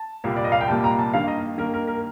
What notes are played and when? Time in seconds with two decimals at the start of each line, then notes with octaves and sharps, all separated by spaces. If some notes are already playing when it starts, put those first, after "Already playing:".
Already playing: A5
0.24 C2 A#2 G3 A#3
0.36 D5
0.44 D#5
0.52 F5
0.61 G5
0.68 C2 A#2 G3 A#3 A5
0.84 A#5
0.99 A5
1.14 G2 D#3 A#3 F5
1.28 D#5
1.58 G2 D#3 A#3 A#4
1.74 A#4
1.87 A#4